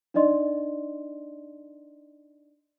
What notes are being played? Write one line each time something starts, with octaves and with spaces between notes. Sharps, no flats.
D4 D#4 D5 D#5 C6